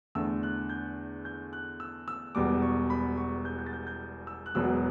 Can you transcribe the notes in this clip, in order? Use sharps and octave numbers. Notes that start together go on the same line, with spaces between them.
E2 D3 A3 E6
F#6
G6
G6
F#6
E6
E6
E1 E2 B2 G3 D6
C#6
B5
C#6
G6
G6
A6
G6
G6
E6
F#6
E1 E2 B2 F#3 B3 E6